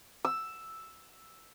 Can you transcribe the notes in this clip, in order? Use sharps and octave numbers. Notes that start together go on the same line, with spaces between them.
E6